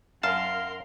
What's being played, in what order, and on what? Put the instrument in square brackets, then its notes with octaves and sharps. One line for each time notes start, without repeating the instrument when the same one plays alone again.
[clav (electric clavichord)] F#2 A5 [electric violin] A#4 C6 [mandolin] F5